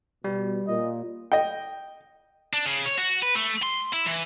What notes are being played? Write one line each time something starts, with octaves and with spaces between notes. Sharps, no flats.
B2 G3
A#2 D#5
D#5 G5
D4
C#3
C#5
F#4
B4
A3
C6
E4
E3